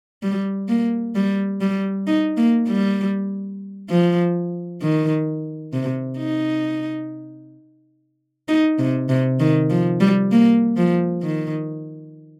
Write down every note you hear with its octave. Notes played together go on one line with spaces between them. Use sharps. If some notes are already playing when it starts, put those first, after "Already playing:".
G3
A#3
G3
G3
D#4
A#3
G3
F3
D#3
C3
D#4
D#4
C3
C3
D#3
F3
G3
A#3
F3
D#3